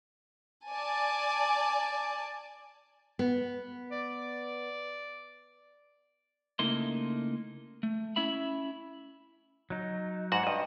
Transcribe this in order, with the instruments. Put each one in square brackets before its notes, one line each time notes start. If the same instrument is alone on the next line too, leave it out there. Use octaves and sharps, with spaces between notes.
[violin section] D5 G#5 A5
[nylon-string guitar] B3
[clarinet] D5
[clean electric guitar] C#3 A3 A#3 D#4 E4 C6
A3
C#4 E4 E5 B5
[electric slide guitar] F#3 D#4
[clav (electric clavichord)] G#2 F#4 F#5
[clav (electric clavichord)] G2 [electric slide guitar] D#5